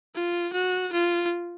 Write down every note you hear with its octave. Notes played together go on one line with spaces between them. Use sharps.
F4
F#4
F4